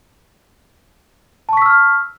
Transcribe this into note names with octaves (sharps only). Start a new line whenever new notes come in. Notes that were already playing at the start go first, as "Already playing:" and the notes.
A5 C#6 E6 F6 B6